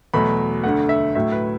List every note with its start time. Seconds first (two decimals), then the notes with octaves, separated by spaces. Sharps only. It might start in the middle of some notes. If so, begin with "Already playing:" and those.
0.14 E2 B2 F#3 A3 B5
0.64 D2 D3 A3 F#5
0.89 E5
1.15 A2 F#3 A3 E5
1.32 B4